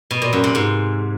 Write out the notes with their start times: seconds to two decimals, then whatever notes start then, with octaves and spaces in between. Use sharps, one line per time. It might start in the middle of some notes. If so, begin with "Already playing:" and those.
0.11 B2
0.22 A#2
0.33 F#2
0.44 C3
0.55 G#2